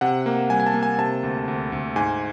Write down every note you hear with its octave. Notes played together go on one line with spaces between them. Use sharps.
C3 F#5
A#3
G3 G#5
G#5
A5
A#3
G#5
C3 A5
D2
D2
D2
G#2 G#5